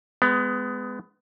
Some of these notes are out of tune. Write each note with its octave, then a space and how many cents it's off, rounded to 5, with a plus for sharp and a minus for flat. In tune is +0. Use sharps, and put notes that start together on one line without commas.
G#3 +0 B3 +25